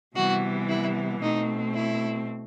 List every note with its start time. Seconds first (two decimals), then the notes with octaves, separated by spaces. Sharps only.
0.15 C3 E3 G3 B3 F#4
0.68 E4
1.21 B2 A3 C4 D#4
1.74 E4